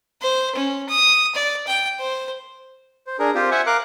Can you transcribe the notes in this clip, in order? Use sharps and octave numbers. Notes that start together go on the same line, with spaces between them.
C5
C#4
D#6
D5
G5
C5
C5
D4 G#4 A#4
C4 F4 G4 C5
C5 E5 F#5 G#5
A#4 F5 D6 F#6